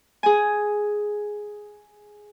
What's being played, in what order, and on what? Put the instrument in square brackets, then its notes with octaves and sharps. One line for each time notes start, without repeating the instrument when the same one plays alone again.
[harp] G#4 G#5